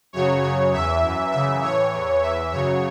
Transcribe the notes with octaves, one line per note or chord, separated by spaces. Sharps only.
F#2 C#3 F#3 C#5
F#2 C#3 F#3 C#5
E2 E3 E5
F#2 E3
F#2 C#3 E3 E5
A2 E3 C#5
E2 E3
E2 E3 E5
F#2 C#3 F#3 C#5